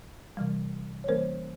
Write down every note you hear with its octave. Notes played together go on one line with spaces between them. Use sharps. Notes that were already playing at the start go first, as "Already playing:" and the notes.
C3 E3 G3
C#5
E3 G3 A#3 C#4 A#4 C5